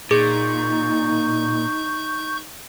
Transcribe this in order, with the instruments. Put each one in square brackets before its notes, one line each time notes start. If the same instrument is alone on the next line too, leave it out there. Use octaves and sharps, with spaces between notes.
[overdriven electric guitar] A#2 [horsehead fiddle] D#4 [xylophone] G#4 [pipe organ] C#6 G6